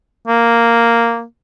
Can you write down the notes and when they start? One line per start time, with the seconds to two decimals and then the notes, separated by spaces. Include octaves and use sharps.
0.28 A#3